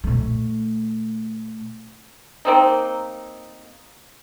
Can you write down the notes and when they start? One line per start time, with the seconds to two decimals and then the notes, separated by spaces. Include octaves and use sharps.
0.04 A#2 A3
2.45 A#3 C4 D#4